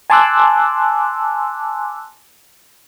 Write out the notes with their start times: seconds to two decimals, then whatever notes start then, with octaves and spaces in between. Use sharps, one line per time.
0.10 G#5 A5 C6 D6 E6 F#6